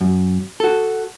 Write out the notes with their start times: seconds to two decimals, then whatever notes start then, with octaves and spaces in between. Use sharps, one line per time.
0.01 F#2
0.60 F#4 A4